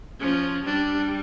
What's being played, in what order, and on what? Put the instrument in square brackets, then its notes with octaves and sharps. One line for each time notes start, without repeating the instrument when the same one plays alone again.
[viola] F3 [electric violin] C#4
[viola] G3 [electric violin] D4